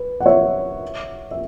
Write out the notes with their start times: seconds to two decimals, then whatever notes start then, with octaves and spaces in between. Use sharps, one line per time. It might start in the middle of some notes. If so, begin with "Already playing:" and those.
Already playing: B4
0.20 F#5
0.26 C#5 E5
1.31 E5